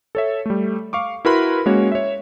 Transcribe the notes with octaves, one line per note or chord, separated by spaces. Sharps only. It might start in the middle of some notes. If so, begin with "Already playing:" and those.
A4 C#5 E5
G3 A3
F5 C#6 D6
E4 F#4 A#4 B4 B5 C6
G#3 A#3 C#4 F#4 C#5
C#5 E5